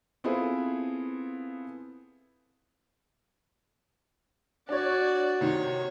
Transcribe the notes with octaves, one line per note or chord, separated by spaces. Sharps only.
B3 C4 E4 F4 G#4 A4
D4 F#4 C#5 D5
C3 D#3 C#5